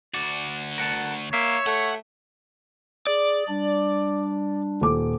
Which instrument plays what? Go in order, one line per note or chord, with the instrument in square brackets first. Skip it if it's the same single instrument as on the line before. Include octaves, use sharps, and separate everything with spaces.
[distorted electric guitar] D2 F#4 [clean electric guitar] D5
[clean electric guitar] A#4 F#5 A5
[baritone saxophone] A#3 [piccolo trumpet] C#5 [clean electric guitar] E5
[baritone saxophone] A3 [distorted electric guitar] F#5
[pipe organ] G#4 [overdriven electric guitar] D5
[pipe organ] G3 D4
[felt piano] D#1 D6 [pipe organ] A#2